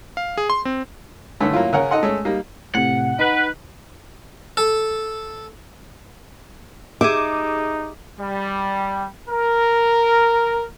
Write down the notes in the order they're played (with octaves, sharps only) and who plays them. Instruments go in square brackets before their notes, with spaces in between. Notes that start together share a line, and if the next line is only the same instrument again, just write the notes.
[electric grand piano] F5
G#4
C6
C4
[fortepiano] G2 D3 D#3 A3 C#4
F#3 A#3 C#4 E4 F4
C#3 C#4 A#4 C#5 F#5
D#4 A4 D#5 F#5 C6
G#3 A3 C#4
G3 A#3 D#4
[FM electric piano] A2 C3 [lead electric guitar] F#5
[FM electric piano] D#4 [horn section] B4
[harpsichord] A4
[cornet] D#4 [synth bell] G4 G#4 [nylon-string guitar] E5 [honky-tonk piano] D6
[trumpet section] G3
A#4